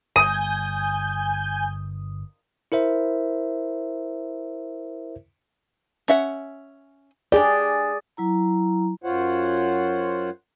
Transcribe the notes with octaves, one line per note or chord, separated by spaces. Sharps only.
G1 G#5 D#6 G6
E4 A#4 C5 E5
C#4 E5 F#5
D4 G4 G#4 D5
F#3 E4 A#5
F#2 F4 C5 C#5 F#5